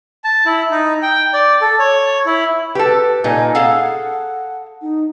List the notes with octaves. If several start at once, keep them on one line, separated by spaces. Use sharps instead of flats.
A5
E4
D#4
G5
D5
A4
C#5
E4
G4 A4 B4
A#2 D#4 G#5
G#4 A4 F5 F#5
D#4